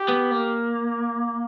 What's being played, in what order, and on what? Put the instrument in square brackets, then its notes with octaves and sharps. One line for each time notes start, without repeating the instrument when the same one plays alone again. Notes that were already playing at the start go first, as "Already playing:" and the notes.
Already playing: [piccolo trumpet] G4
[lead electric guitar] B3
A#3